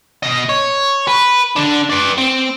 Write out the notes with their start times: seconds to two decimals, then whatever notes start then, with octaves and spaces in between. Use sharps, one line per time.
0.23 B2 D#5
0.49 C#5
1.07 B4
1.56 D3 D4
1.90 B4 D5
2.18 C4